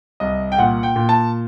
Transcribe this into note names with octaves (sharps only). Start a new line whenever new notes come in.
C2 D#5
G5
A#2 F#5
G5
A#2
A5